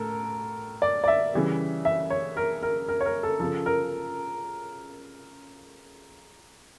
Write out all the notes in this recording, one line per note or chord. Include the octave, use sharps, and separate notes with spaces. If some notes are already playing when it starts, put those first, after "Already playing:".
Already playing: A2 A4 A#4
D5
D5
E5
C#3 E3 G3
E5
C#5
A#4
A#4
A#4
C#5
A#4
A4
C#3 F3 A4
A#4